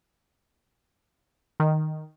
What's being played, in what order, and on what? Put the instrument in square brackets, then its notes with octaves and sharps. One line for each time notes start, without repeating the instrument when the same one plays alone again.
[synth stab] D#3